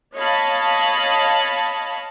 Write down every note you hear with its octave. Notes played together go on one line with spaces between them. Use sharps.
C#5 D#5 F5 A5 B5